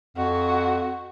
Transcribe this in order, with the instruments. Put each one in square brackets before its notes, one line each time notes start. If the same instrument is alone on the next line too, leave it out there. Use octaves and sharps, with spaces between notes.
[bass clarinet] F2 [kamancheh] F#4